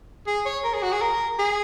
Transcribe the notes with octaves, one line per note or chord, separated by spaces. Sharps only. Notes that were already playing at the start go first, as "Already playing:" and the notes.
G#4
C#5
A#4
G#4
F#4
G#4
A#4
G#4